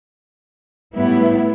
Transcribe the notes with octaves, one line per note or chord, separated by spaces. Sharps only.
A2 G3 B3 E4